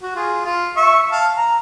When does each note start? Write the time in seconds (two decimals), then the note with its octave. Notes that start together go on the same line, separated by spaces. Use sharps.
0.02 F#4
0.15 F4 G#4
0.45 F4
0.76 E5 C#6
1.11 F5 A5
1.37 A#5